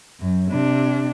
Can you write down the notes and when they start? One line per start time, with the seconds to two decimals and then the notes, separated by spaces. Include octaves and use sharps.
0.20 F#2
0.51 C3 D4